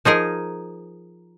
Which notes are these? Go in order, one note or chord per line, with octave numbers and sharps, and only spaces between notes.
F3 D#4 G#4 A#4